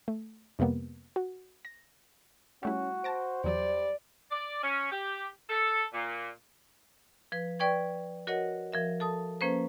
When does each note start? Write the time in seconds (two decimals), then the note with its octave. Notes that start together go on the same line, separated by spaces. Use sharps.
0.08 A3
0.59 F2 C3 G3 A#3 B3
1.16 F#4
1.65 A#6
2.63 G3 A3 C#4 E4 F#4
3.04 C5 A5 A#6 D7
3.44 E2 F#3 G3 D5
4.31 D5
4.63 C#4
4.92 G4
5.50 A4
5.94 A#2
7.32 F3 B4
7.59 B4 D5 G5 C#6 G#6
8.27 F#4 A#4 C#5 D#5 F#5
8.72 F3 A#4 E5
9.00 A4 A5 D#6
9.41 F3 A#3 C#4 B4 C5